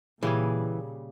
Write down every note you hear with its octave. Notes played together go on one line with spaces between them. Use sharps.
A#2 C#3 E3 G3 G#4